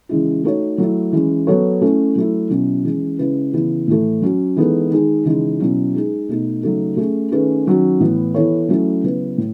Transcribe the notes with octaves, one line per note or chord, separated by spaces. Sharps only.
C#3 E3 G#3 C#4 E4
A3 D#4 F#4 A4 C#5
F#3 A3 E4
E3 G#3 C#4
F#3 B3 F#4 A4 C#5
A3 C#4 E4
F#3 A3 E4
B2 F#3 C#4 E4
E3 G#3 C#4
C#3 G#3 C#4 E4 B4
C#3 E3 B3 E4
A2 E3 A3
F#3 C#4 F#4
E3 G#3 B3 D#4 A4
D#3 G#3 D#4 G#4
C#3 E3 G#3 D#4
B2 F#3 C#4 E4
G#3 D#4 G#4
B2 A3 D#4
C#3 F#3 A3 D#4 A4
A3 C#4 G#4
D#3 A3 C#4 G#4 B4
D#3 F#3 C#4 F#4
A2 E3 B3 E4 B4
E3 B3 E4 A4 C#5
F#3 A3 C#4 E4
C#3 F#3 B3 E4 B4
A2